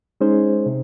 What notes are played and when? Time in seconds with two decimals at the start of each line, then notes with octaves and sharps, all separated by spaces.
0.21 G#3 C#4 D#4 G#4 C5
0.66 C3